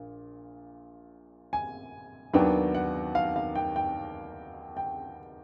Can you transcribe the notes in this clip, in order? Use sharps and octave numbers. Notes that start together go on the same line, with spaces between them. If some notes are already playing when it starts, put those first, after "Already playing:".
Already playing: A#1 A#2
G#5
D#2 D#3 F#3 B3 D4 G5
F#5
F5
F5
G5
G5
G5